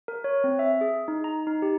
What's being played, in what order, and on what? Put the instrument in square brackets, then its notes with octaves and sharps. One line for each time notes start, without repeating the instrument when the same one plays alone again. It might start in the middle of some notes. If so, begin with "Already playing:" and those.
[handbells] A#4
C#5
C4
E5
G#4
D#4
A#5
D#4
G4